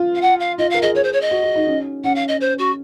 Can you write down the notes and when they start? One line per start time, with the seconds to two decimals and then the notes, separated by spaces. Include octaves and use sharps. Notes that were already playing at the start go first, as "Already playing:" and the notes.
Already playing: F4
0.15 F5
0.22 F#5
0.40 F5
0.58 F4 D#5
0.70 F5
0.74 A#4
0.82 G#4 D#5
0.95 G#4 C#5
1.04 C5
1.13 C#5
1.21 D#5
1.31 F#4
1.43 F#4
1.56 D#4
1.67 C#4
2.04 C#4 F#5
2.15 F5
2.28 D#5
2.41 C5
2.58 F#4